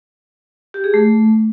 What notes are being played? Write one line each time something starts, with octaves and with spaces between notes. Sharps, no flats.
G4
G#4
A3